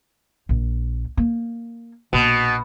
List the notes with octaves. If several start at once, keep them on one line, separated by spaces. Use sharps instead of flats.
A#1
A#3
A#1 B2